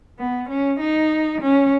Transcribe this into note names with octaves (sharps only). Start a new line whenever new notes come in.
B3
C#4
D#4
C#4